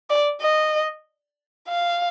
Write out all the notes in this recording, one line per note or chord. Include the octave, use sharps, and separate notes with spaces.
D5
D#5
F5